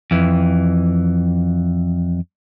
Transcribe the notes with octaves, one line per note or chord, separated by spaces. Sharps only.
F2 E3